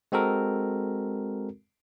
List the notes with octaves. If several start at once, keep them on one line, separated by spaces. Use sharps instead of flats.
G#3 C4 F#4 A4 A#4